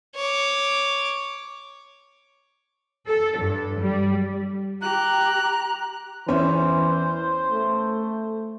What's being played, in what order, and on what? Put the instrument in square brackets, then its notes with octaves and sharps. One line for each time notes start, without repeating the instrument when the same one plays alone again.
[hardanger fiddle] C#5 D6
[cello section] A4
G2
G3
[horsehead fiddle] G4 [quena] A#5 [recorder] F#6
[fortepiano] E2 C#4 E5 [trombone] E3 [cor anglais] C5
[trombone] A3